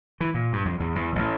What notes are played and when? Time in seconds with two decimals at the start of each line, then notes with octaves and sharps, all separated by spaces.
0.20 E3
0.34 A#2
0.53 G2
0.65 F2
0.80 E2
0.95 E2
1.15 A1